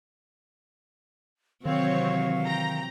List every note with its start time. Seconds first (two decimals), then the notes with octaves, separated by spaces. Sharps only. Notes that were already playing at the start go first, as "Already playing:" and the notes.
1.65 C3 D#3 E3 F#3 C4 C#5 F5
2.42 G5 A#5